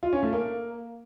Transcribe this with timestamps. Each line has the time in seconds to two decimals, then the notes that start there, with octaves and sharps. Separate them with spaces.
0.03 F4
0.13 C#4
0.23 A3
0.33 A#3